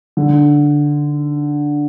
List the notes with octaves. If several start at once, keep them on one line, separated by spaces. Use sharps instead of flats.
D3